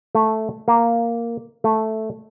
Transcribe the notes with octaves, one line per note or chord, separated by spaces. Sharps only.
A3
A#3
A3